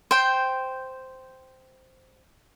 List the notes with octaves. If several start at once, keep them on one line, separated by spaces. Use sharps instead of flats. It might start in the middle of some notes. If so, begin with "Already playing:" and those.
C5 G5